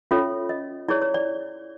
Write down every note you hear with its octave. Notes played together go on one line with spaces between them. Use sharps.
C#4 F4 A4 C#5 E5
D#5
E4 G#4 C#5 D5
C#5
D5